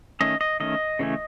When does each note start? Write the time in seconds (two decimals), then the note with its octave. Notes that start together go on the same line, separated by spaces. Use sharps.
0.20 D#3 A3 C#4 D#5
0.41 D#5
0.60 D#3 A3 C#4 D#5
0.99 C#3 E3 A3 C#4